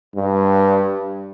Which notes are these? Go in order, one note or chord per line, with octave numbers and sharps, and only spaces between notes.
G2